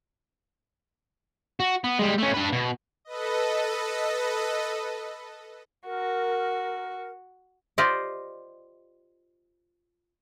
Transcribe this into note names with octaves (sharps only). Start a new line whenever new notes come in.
F#4
B3
G3 G#3
A3 C#4
D4 B4
B2
A4 B4 D#5
F#4 A#4
F4 G4 C5 D5 D#5